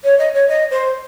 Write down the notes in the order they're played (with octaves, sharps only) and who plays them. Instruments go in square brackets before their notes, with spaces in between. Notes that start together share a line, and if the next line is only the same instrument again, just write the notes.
[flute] C#5
D#5
C#5
D#5
C5